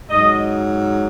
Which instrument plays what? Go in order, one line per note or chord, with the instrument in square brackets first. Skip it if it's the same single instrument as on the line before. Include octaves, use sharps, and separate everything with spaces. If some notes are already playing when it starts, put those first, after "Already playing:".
[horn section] G#2 F#3 D#5